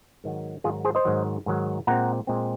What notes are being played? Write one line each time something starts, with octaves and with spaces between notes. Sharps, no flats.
G#2 D#3 F#3
G#2 D#3 F#3 F4 G#4
G#4 C5
C5 D#5
G#2 D#3 F#3
G#2 D#3 F#3
A#2 G#3 C4 F#5 A#5
A#2 G#3 C4